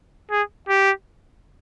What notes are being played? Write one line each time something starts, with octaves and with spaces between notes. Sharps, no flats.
G#4
G4